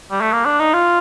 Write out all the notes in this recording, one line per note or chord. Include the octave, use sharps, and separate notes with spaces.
G3
A3
A#3
D4
D#4
F4